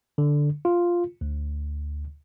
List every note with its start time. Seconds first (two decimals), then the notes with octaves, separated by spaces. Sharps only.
0.18 D3
0.65 F4
1.21 D2